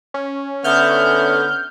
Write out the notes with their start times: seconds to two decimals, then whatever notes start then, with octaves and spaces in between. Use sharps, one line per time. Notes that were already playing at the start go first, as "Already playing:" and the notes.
0.14 C#4
0.64 D3 B3 E5 F6 G6